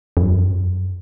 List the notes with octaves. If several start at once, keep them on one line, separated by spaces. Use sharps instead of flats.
F2
F#2